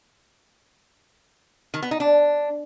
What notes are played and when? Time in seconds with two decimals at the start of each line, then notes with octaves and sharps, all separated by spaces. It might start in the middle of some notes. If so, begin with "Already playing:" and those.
1.74 D#3
1.82 B3
1.91 D#4
2.00 D4